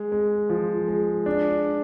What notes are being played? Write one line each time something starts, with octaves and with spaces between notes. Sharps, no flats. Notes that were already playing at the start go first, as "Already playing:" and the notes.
Already playing: G#3
G#3
F3
G#3
D4